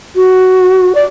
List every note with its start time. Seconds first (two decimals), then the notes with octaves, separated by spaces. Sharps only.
0.16 F#4
0.95 D5